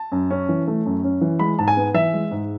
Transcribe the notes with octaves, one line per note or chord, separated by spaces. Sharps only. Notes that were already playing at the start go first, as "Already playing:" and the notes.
Already playing: A5
F#2
C#4
E3
A3
F#2
C#4
E3
G#3 B5
G#2 A5
G#5
B3
E3 E5
G#3
G#2